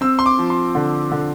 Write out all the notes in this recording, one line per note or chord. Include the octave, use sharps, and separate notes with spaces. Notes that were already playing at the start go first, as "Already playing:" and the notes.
C4 E6
C6
D6
F3
C6
D3
D3